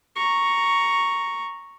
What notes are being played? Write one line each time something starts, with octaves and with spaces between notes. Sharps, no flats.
A#5 C#6